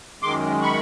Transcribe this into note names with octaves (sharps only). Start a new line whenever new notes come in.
F#2 D#3 G#3 C6 D6
B5 C#6